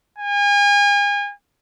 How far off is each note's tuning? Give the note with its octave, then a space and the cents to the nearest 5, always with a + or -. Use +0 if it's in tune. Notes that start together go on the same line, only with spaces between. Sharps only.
G#5 -35